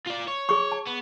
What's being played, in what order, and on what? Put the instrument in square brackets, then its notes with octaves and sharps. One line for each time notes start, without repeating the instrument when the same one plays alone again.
[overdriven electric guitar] F4 D5
C#5
[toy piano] G#4 C#6
A5
[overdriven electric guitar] B3